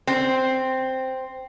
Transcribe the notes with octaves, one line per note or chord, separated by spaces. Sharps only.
C4